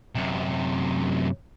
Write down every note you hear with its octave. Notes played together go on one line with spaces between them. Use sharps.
F#2 C3